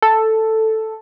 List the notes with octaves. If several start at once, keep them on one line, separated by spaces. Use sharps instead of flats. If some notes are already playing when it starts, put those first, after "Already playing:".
A4